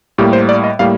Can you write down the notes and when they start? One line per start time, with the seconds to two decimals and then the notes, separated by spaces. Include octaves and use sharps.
0.18 A2 G3 A#3 G4
0.33 C5
0.49 D5
0.64 D#5
0.79 A2 G3 A#3 F5